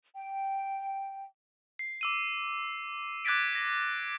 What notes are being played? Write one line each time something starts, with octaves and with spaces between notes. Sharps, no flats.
G5
C7
D6 E6 D#7
D6 F#6 G#6 A6 B6 D7
A#6